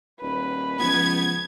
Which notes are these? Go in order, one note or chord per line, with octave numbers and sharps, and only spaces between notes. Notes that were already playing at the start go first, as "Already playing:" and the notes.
D#1 B4
C#2 F3 B3 G#6